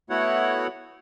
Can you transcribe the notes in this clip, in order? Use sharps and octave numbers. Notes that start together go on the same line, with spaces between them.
A3 B3 E4 F#4 C#5 F#5